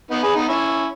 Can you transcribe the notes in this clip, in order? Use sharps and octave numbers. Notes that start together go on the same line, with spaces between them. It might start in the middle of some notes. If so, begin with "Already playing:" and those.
B3 D#4
G#4 B4
B3 D#4
C#4 E4